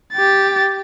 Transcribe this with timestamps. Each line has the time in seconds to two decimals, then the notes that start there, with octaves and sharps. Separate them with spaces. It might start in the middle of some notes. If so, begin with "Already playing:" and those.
0.14 G4 A6